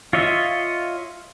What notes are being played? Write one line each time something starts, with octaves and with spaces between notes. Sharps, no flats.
F4 C#5 D#5 E5